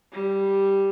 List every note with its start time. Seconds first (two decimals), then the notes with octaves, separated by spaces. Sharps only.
0.13 G3